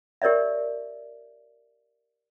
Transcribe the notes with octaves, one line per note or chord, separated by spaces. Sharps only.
G4 A#4 C#5 D5 E5